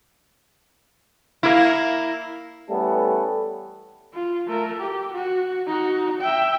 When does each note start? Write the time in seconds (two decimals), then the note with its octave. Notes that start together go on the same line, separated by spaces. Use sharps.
1.43 A#3 E4
2.70 E3 G3 A3 B3 C#4 A4
4.14 F4
4.47 A3 A#4
4.80 G4
5.14 F#4
5.66 D#4 F#4
6.21 E5 G5